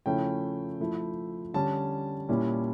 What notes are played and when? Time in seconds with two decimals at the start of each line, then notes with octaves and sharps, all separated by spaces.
0.06 C#3 F3 A3 C#4 E4 G5
0.80 F3 A3 E4
1.54 D3 G3 C#4 A5
2.29 A#2 G3 C#4 E4